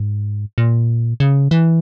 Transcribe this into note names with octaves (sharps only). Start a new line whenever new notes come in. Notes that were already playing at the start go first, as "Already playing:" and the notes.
Already playing: G#2
A#2
C#3
E3